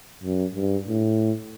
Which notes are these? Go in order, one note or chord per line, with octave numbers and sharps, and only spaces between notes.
F#2
G2
A2